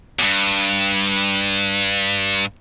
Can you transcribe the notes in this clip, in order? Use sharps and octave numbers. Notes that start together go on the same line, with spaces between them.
E2 G2